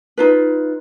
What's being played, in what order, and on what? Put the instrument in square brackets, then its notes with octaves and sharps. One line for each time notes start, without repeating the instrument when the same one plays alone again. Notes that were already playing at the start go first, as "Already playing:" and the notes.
[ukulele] D#4 F4 B4